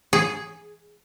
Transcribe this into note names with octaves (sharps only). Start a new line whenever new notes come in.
G#4